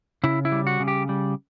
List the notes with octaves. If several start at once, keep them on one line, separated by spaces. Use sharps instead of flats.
C#3 E4
E4
G3
F#4
C#3
G4
G3